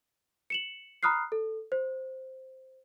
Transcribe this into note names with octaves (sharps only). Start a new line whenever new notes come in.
C#7 E7 F#7
A#5 B5 D#6 F6 F#6 C7
A4
C5